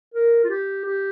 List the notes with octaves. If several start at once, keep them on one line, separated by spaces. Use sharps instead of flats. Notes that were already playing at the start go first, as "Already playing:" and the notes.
A#4
F4
G4
G4